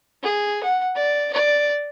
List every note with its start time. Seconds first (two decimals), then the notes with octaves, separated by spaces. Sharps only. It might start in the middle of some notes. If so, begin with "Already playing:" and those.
0.23 G#4
0.63 F#5
0.96 D5
1.33 D5